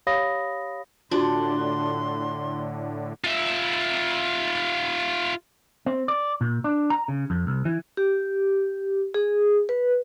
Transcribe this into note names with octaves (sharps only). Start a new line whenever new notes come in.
G4 C#5 F5 B5 D#6 A#6
A2 D3 D4 F4 F#4 C6
F4 E5
C4
D5
A#2
D4
A#5
C#3
F2
C2
E3
G4
G#4
B4